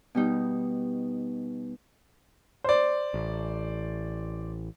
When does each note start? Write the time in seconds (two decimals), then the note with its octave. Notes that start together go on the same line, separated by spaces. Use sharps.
0.15 B2 G3 D#4
2.64 C5 D5
3.14 A1